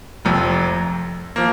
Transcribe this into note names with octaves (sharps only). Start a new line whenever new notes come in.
F1 F2 C3
F3 A#3